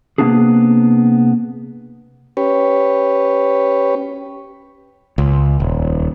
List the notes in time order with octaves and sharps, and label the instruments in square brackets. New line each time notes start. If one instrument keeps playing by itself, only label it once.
[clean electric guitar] C3 G#3 A#3 B3 D4 G#4
[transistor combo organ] C#4 G4 B4 C#5
[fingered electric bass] C#2
D#1